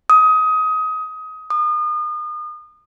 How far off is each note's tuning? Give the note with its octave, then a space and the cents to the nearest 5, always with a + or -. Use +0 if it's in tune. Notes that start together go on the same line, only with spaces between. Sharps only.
D#6 +20
D#6 -35